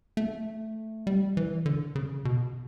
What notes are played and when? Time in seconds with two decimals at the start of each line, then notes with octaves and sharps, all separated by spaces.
0.17 A3
1.07 G3
1.37 E3
1.66 D3
1.95 C#3
2.25 B2